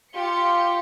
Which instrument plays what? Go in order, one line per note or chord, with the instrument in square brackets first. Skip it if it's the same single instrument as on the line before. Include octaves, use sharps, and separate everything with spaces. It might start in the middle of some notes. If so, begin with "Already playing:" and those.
[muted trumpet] F4 [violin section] G4 C#7